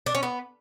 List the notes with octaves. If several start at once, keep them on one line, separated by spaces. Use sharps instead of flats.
D4
C#4
B3